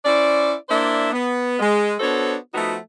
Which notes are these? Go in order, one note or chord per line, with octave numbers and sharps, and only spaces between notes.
C#4 E4 C5 D5
A#3 D4 E4 C5 D5 E5
B3
G#3
B3 D4 F#4 A4 C5 C#5
F3 A3 B3 D#4 F#4